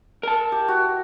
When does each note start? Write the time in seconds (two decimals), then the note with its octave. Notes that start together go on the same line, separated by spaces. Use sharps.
0.23 A#4 A5
0.52 G4
0.68 F#4